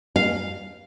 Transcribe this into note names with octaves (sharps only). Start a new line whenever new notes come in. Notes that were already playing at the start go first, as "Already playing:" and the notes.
F5